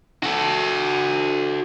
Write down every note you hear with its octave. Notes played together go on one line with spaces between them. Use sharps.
F#4 A4